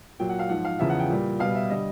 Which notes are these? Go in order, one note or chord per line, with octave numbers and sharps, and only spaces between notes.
A#2 F#3 G5
F#5
F5
G#2 F3 F#5
F5
E2 C#3 F3 E5
F#5
G5
A#2 G3
B2 G3 F5
E5
D3 G3 D#5